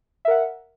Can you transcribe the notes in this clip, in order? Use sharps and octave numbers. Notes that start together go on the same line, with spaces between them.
A#4 E5 F#5